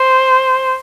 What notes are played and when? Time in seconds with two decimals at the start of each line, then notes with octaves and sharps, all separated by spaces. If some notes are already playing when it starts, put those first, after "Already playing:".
Already playing: C5